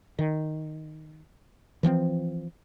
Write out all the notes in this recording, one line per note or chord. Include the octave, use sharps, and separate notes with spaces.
D#3
E3 F3 B3 C4